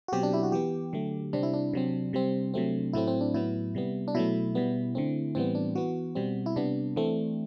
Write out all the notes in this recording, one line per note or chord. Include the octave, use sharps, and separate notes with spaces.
F#4
B2 F#3 C4 G4
D4
E4
F#4
E3 B3 G4
D3 F#3 A3
C3 G3 C4 D4
E4
D4
C3 F#3 C4
C3 G3 C4
C3 F#3 A3 C4
A2 F#3 A3 C4 E4
C4
D4
A2 F#3 B3 E4
C3 G3 B3
D4
B2 F#3 A3 E4
B2 G3 B3
D3 A3 C4
A2 E3 G3 B3 C4
D4
E3 B3 F#4
B2 G3 C4
E4
C3 G3 B3 D4
E3 A3 C4